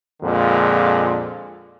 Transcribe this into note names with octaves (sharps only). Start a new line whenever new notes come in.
F2 A#2 D3 G#3